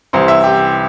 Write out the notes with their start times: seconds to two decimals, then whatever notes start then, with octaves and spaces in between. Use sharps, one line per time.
0.13 C2 C3 E3 C5
0.28 E5
0.43 G4